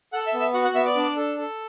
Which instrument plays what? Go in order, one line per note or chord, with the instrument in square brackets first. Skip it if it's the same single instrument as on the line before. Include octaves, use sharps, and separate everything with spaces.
[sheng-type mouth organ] A4 F#5 F#6
E5 E6
B3
E5 E6
F#4 F#5 F#6
F#5 F#6
B3 E5 E6
D5 D6
D4
A4
A4